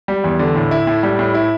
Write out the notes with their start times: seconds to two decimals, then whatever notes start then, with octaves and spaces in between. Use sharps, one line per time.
0.08 G3
0.24 E2
0.39 D3
0.55 A2
0.71 E4
0.87 A2
1.03 G3
1.19 A2
1.34 E4